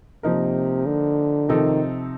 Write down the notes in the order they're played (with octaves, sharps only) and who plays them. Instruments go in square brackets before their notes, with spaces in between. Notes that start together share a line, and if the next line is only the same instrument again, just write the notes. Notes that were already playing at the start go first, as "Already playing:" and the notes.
[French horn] C3 [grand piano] F3 A#3 D#4 A#4
[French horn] D3
[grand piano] C3 F3 C4 D#4 A4 [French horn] D#3